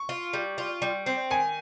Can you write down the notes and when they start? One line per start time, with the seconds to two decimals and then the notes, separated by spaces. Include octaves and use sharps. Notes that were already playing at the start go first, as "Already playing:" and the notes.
Already playing: C#6
0.09 F4
0.33 G3
0.58 F4
0.82 G3
1.06 C4
1.31 D#3 G#5